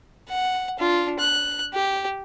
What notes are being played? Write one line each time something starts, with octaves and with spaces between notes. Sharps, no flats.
F#5
D4 F4
F#6
G4